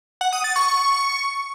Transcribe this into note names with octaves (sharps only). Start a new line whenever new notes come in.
F#5
D#6
A6
C#6
C#6